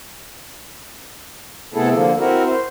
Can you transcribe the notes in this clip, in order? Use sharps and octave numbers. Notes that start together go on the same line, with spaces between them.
C3 A3 B3 E4 G#4 A4
D3 F3 A#3
C4 E4 F#4 A#4
C5